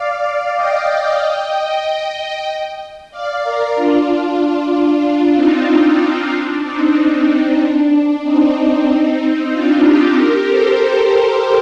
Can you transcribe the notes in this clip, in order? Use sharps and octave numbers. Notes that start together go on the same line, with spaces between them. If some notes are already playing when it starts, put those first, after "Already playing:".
Already playing: D5 F5
D5 F5
D#5 G5
D5 F5
A#4 D5
D4 F4
D4 F4
C4 D#4
D4
C4
D4
C4 D#4
D4
C4 D#4
D4 F4
D#4 G4
G4 A#4
A4 C5